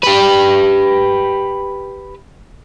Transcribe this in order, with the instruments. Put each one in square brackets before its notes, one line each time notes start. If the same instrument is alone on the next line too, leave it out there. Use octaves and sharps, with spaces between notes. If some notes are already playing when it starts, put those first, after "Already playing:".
[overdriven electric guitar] G4 B4